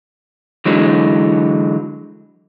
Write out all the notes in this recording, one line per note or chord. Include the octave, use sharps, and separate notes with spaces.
D3 E3 F#3 G#3